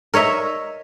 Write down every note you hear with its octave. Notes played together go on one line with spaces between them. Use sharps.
A#4 C#5 D#5 E5 A#5